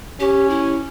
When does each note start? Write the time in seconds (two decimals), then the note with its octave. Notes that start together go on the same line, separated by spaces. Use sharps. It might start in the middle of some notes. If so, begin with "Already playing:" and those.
0.20 C#4 G4
0.50 E4